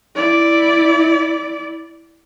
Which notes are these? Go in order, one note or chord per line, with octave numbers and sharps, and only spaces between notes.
E4 D5